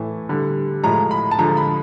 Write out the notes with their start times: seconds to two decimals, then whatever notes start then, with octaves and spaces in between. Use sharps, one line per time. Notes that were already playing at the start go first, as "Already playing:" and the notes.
Already playing: A2 E3 A3
0.29 D3 G3
0.83 A2 F3 G#3 A#5
1.11 B5
1.31 A5
1.38 D3 F3 G#3 A#5
1.57 B5